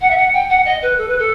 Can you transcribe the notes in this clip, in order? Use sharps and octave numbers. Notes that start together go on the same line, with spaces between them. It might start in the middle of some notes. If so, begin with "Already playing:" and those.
F#5
E5
F#5
G5
F#5
D#5
B4
A4
B4
A4